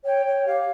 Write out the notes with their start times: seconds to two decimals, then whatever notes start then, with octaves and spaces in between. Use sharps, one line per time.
0.04 C#5 G5
0.25 C#5
0.45 G4 F5